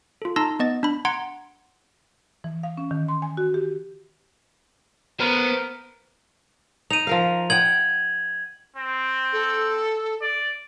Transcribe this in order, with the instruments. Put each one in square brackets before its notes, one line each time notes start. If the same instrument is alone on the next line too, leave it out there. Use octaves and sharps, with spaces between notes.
[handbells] F4 A4
D#4 A5 A#5 C6 E6 A#6
B3 D#5 A6
D4 B5
F#5 A#5 C6 G#6 D7
[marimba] E3
F5
C#4
D#3
C6
G#5
F#4
G4
[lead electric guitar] B3 [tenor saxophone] A#4 [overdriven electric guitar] C5 B5
[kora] D#4 [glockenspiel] D#7 F7
[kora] F3 A#4 F5
[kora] D#5 F#5 G5 [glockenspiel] G#6 F#7
[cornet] C4
[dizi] A4
[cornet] D5